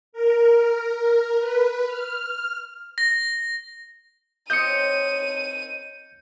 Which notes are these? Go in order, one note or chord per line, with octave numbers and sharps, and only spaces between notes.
A#4
B4
F6
A#6
C4 D#4 C#5 G6 C#7 D#7